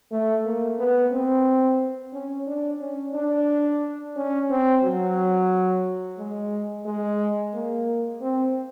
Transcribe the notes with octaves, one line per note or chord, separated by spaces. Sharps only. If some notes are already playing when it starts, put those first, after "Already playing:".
A3
A#3
B3
C4
C#4
D4
C#4
D4
C#4
C4
F#3
G#3
G#3
A#3
C4